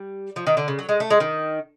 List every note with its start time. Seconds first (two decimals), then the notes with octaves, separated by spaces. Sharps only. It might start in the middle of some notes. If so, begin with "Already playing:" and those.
Already playing: G3
0.36 F3
0.47 D#3
0.57 D3
0.68 C#3
0.79 F#3
0.89 G#3
1.00 A3
1.10 G#3
1.20 D#3